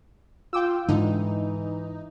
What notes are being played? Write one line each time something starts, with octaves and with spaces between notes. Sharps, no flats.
F4 G5 D6 E6
G#2 D3 E3 D#4